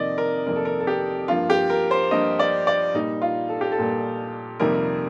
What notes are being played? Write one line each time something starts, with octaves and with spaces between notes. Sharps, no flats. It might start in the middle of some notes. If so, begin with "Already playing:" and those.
Already playing: F2 C3 D#3 A#3 D5 D#5
A#4
F2 C3 D#3 A#3 A#4
A4
A#4
A4
G4
G2 F3 A#3 F4
G4
A#4
C5
G2 F3 A#3 D#5
D5
D5
A#2 G3 A#3 D#4
F4
A4
G4
A4
A#2 G3 A#3
F2 C3 D#3 G3 A#3 A#4